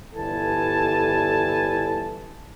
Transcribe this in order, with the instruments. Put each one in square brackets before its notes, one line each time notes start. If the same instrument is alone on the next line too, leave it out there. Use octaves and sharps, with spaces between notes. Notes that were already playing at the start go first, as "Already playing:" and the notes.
[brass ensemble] G1 E3 G3 A4 G#5 A5